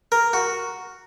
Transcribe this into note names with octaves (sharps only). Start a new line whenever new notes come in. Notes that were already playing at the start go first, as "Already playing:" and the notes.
A#4
F#4